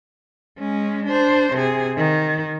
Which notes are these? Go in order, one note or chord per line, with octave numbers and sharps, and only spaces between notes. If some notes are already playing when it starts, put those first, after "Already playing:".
G#3 C#4
D4 C5
C3 G#4
D#3